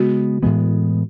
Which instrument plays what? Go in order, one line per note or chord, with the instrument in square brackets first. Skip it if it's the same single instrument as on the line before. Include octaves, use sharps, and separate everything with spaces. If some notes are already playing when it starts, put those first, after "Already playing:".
Already playing: [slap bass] C#3 G#3 B3 [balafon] F#4
[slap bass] A2 E3 G#3 B3